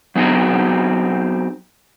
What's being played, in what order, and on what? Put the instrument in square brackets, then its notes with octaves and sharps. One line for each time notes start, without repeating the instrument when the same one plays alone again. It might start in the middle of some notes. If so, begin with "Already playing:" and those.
[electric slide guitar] F#3 B3 C4 D#4 F#4 G#4